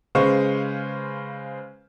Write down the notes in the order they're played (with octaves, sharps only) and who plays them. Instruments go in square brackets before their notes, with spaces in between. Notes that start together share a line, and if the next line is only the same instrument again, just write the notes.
[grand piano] C#3 G#3 B4 C5 F5 C#6